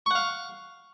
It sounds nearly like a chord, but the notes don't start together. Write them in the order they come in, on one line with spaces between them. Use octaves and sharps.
C#6 F#5 F5